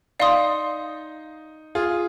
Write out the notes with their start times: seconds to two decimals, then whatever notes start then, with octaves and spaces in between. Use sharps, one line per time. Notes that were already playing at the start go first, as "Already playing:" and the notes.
0.20 D#4 D5 F5 C6 D#6
1.75 F4 G#4